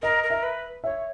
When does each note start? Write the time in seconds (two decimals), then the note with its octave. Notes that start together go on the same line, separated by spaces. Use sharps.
0.02 A#4 D#5
0.23 A#4
0.30 E5
0.43 B4
0.84 C#5 E5